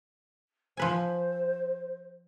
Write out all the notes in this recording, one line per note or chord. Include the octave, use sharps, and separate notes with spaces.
F3 B4 C5 G#5